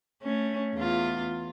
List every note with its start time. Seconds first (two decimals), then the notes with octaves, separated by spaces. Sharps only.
0.22 A3 C#4
0.75 E2 F4